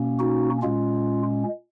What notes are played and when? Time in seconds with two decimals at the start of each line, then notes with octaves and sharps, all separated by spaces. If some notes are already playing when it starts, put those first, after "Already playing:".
Already playing: B2 A#3 C#4
0.19 D#4 F#4
0.62 A#2 G#3 C#4 F4